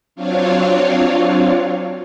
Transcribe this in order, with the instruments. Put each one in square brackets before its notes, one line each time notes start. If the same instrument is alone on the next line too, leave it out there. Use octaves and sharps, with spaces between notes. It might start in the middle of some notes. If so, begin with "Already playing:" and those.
[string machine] F#3 C4 D4 F4 C#5 F5